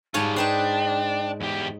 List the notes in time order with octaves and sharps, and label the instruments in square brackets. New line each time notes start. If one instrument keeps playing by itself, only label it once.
[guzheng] G#2 C#5 G#5 [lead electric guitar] G3 F4 [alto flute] A5
[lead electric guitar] D4 [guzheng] D#4 B4 C5 [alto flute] G5
[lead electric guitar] E2 G4